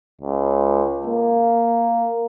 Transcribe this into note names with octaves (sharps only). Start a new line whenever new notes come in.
C#2
A#3